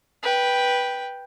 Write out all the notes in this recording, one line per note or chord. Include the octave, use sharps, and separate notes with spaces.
B4 G5